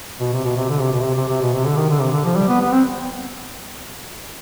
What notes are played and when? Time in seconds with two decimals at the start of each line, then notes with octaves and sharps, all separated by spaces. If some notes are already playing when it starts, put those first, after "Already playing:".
0.20 B2
0.33 C3
0.45 B2
0.56 C3
0.69 D3
0.81 C3
0.92 B2
1.04 C3
1.17 C3
1.29 C3
1.41 B2
1.53 C3
1.65 D3
1.76 D#3
1.89 D3
2.01 C3
2.12 D3
2.24 F3
2.36 G3
2.49 B3
2.61 B3
2.72 C4